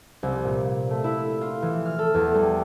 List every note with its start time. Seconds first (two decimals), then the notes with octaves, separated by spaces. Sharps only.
0.23 C2
0.45 A#2
0.90 A3
1.04 E4
1.41 F4
1.62 E3
1.85 F6
1.99 A4
2.14 E2
2.34 G3